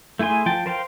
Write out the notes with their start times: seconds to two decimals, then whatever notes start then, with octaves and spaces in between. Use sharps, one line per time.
0.19 A3 E4 G#4 G#5 C6
0.46 F3 G5 A5
0.66 A#4 C5 F5 G5